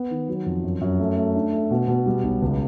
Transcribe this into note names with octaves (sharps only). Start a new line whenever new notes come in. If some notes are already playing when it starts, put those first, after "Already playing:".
Already playing: B3
D#3
F#3
F2
F#2
F#2
A3
A3
D4
A3
B2
B2
G3
B1
C#2